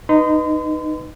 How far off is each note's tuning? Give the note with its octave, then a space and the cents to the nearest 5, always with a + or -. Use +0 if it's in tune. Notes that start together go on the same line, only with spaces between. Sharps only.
D#4 -10 B4 +0 C6 -40